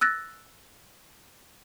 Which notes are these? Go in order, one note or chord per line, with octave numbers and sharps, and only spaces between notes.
E6 F#6 A6 A#6